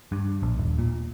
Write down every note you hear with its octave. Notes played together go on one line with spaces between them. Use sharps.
G2
A#1
D#1
A#2